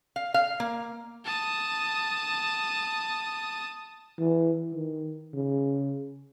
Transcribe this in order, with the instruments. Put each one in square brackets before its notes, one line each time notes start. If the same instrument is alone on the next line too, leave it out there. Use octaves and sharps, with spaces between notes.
[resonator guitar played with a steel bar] F5
F5
A#3
[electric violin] A5 D#6
[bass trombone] E3
D#3
C#3